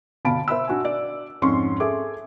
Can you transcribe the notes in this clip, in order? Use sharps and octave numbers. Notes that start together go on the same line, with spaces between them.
G1 B2 F5 A5 B5 D7
C5 E5 B5 E6
D4 F#4 G#5
D5
F2 G#2 C#4 C6 C#6
G#4 A4 E5 D6